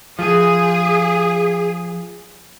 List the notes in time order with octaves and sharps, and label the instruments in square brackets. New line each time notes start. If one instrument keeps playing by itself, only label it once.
[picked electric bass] F3 [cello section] G#4